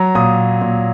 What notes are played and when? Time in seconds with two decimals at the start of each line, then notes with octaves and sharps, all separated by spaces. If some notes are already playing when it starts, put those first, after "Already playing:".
Already playing: F#3 A#5
0.15 A#2 D#6
0.61 A#2